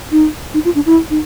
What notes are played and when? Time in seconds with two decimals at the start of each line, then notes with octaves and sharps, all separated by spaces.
0.12 D#4
0.54 D#4
0.65 F4
0.75 D4
0.86 E4
1.10 D#4